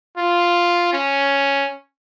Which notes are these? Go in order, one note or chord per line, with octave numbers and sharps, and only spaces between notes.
F4
C#4